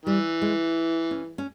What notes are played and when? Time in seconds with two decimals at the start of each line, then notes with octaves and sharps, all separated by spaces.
0.05 E3 G3
0.42 G#3
1.11 C#4
1.38 C#4